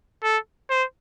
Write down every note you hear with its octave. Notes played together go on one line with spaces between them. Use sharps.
A4
C5